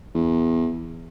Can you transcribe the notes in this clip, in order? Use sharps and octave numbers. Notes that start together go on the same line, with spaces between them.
E2